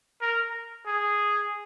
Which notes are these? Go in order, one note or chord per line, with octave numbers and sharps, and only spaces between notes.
A#4
G#4